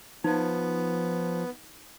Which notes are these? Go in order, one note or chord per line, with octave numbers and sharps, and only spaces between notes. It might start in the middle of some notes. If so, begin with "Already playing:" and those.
F3 B3 D#4